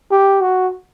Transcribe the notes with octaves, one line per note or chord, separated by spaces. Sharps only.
G4
F#4